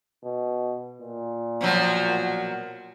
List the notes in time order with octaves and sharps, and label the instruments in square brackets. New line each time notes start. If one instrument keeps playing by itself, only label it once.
[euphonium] B2
A#2
[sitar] B2 F3 F#3